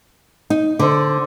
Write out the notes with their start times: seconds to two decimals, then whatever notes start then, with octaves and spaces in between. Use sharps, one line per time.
0.50 D#4
0.79 D3 A4 C5 D5